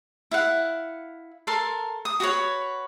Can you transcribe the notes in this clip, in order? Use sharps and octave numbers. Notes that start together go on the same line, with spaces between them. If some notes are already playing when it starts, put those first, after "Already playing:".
E4 F5 F#5
A4 A#4 A5 C6
D#6
F#4 G4 B4 C#5